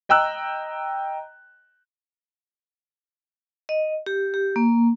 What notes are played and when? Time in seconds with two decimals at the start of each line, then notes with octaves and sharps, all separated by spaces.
0.09 D#5 G5 A#5 E6 F#6
3.69 D#5
4.06 G4
4.34 G4
4.56 A#3